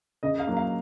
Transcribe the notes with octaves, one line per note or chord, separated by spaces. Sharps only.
C#3 D#5
F5
F#3 A#3
F5